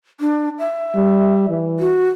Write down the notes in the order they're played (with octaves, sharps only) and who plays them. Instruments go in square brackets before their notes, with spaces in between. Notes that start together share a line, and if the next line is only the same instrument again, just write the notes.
[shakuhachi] D4
E5
[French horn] G3
E3
[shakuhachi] F#4